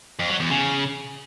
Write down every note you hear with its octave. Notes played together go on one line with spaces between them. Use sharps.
F2
F#3
E2
C#3